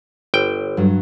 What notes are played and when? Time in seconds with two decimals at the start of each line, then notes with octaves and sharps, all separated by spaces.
0.34 G1 G5
0.77 G2 F#3